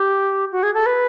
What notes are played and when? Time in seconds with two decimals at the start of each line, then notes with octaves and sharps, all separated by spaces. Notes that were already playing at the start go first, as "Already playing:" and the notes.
Already playing: G4
0.51 F#4
0.63 G#4
0.74 A4
0.86 B4